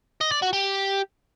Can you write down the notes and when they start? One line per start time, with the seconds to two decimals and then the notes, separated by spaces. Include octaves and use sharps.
0.21 D#5
0.32 D5
0.42 F#4
0.53 G4